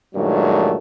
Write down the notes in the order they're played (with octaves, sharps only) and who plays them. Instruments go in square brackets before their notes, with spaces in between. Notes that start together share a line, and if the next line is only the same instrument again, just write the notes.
[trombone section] G2 A#2 D#3 F#3 G#3 A3